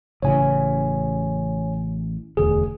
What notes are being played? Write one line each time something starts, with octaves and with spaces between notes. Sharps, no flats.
A1 C#3 E3 C#5 G#5
E1 D2 G#4